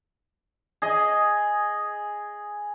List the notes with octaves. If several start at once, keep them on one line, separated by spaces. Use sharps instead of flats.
G#4 D#5